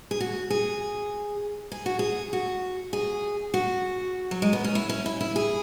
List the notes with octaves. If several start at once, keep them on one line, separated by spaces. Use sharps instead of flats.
G#4
F#4
G#4
G#4
F#4
G#4
F#4
G#4
F#4
F#3
G#3
B3
C#4
E4
C#4
E4
E4
G#4